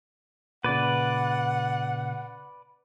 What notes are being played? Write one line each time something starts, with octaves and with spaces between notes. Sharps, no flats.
A#2 C#3 B4 D5 F#5